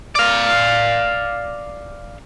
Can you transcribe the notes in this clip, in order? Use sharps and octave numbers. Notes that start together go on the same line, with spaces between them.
D5 F5